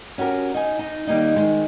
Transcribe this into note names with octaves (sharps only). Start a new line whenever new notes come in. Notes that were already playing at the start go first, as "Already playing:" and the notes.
C#4 F#4 G4 A#4
D#4 G#5
D#4
D#3 G3 A#3 D#4
D#3 G#3